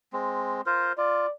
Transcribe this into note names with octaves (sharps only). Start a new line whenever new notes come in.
G#3 C4
F4 A#4 C5
F4 D5